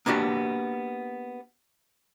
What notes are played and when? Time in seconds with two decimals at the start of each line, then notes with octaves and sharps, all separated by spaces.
0.06 A#3 B3 D4 F#4 G4